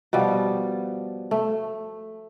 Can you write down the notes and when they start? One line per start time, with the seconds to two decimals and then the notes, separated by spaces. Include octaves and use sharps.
0.13 B2 F3 G3
1.31 A3